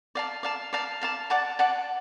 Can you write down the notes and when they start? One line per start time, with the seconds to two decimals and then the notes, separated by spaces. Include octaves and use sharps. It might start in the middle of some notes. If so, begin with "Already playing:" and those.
0.15 D5 F5 A5
0.43 D5 F5 A5
0.73 D5 F5 A5
1.01 D5 F5 A5
1.30 D5 F#5 A5 D6
1.59 D5 F#5 A5 D6